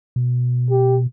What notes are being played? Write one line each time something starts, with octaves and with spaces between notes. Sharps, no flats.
B2
G4